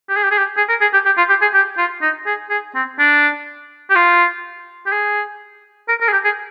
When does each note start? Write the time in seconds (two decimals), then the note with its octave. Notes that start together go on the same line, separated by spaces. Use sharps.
0.09 G4
0.16 G#4
0.23 G4
0.31 G#4
0.38 G4
0.57 G#4
0.69 A#4
0.81 G#4
0.93 G4
1.06 G4
1.18 F4
1.29 G4
1.42 G#4
1.54 G4
1.78 F4
2.02 D#4
2.26 G#4
2.50 G#4
2.75 C4
2.99 D4
3.90 G4
3.95 F4
4.86 G4
4.92 G#4
5.88 A#4
6.01 A#4
6.08 G#4
6.13 G4
6.24 G#4